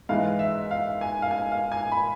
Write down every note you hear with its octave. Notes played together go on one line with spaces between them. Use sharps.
G#2 E3 G#3 F5
E5
F5
G#5
F5
G#5
F5
G#5
B5